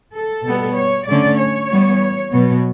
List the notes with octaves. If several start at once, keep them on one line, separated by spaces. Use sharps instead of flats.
A4
B2 G3 B3
C#5
D3 A3 C#4 D5
C#5
E3 G3 B3
B2 F#3 B3